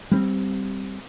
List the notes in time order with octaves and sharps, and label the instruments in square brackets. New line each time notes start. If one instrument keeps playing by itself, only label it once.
[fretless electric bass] G3 B3 C4